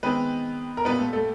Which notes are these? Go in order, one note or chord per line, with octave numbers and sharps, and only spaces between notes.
D#3 G#3 B3 C4 B4
A#4
A#2 G3 B3 B4
A3 A4
A3 A4